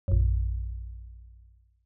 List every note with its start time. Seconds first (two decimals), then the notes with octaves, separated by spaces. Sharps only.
0.08 A#1 F#2